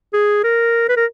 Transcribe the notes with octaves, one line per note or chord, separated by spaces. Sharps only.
G#4
A#4
B4
A#4